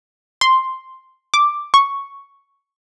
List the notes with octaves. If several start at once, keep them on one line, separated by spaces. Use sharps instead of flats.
C6
D6
C#6